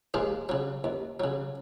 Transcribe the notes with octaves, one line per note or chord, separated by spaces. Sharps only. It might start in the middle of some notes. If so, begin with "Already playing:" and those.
D#2 G#3 A#3
C#3 F#3
D#2
C#3 F#3